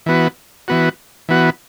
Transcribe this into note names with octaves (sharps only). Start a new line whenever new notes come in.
E3 B3 F#4
E3 B3 F#4
E3 B3 F#4